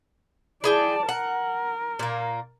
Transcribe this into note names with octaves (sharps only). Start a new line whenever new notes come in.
E4 G#4 D5 G5 A5
A#4 F#5
A#2 A#3